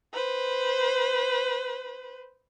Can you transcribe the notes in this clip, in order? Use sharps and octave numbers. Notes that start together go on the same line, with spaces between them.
B4 C5